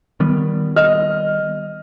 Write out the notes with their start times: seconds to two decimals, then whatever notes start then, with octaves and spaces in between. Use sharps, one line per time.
0.20 D#3 G3 B3
0.76 D#5 F6